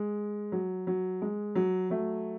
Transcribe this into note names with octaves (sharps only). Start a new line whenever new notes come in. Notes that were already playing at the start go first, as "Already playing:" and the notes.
Already playing: G#3
F#3
F#3
G#3
F#3
F#3 A3